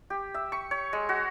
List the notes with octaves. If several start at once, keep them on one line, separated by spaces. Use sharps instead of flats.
G4
E5
C#6
C#5
G#3
F#4